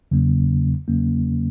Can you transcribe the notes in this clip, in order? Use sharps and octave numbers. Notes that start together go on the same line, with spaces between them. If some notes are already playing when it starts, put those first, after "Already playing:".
E2 C#3 F#3 A#3 C#4
E2 C#3 F#3 A#3 C#4